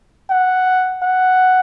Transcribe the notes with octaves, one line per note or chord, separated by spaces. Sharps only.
F#5
F#5